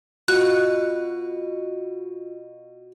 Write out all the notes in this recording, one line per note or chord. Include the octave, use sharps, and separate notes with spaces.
B2 F4 F#6